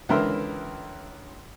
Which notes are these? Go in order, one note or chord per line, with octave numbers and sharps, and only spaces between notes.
C#2 D3 E3 A#4 E5 C6